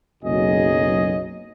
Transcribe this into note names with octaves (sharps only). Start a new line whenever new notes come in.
F#1 B1 F#3 G#4 D#5